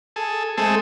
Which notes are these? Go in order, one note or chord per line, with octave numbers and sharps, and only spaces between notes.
G#4 A4
G#3 A3 C4 G#4 A4